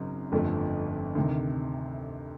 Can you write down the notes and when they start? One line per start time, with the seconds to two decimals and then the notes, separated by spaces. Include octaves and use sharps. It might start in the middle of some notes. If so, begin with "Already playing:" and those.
Already playing: G#1 F#2 C#3 F#3
0.32 G1 F2 D3 F3 A3
1.15 D2 C3 D#3